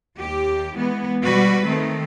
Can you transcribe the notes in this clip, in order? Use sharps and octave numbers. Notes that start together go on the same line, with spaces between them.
D#2 G4
E3 G#3 B3
B2 G3 F#4 B4
D#3 A3 C4